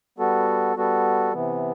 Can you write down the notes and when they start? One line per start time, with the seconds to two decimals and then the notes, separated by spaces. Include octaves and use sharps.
0.18 G3 B3 F#4 A4
0.76 G3 B3 F#4 A4
1.33 C3 E3 B3